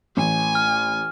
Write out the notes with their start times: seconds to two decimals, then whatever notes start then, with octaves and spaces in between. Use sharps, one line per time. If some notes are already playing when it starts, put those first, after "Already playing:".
0.17 A1 G#5
0.55 F6